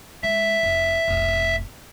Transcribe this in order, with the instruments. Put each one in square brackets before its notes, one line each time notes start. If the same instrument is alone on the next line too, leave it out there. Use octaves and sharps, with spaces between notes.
[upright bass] G#3 [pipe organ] E5
[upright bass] F1
F1 B1